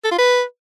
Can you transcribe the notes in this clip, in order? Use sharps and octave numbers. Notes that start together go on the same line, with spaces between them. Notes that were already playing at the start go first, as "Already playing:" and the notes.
A4
F4
B4